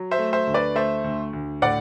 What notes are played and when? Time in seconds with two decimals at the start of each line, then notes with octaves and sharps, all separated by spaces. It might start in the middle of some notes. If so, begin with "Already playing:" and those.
Already playing: F#3
0.11 C5 E5
0.19 A3
0.33 C5 E5
0.47 D2
0.54 B4 D5
0.75 A3 C5 E5
1.04 D2
1.33 D2
1.62 A2 D5 F#5